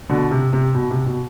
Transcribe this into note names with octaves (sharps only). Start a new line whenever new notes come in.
B2 D3
C3
C3
B2
C3
B2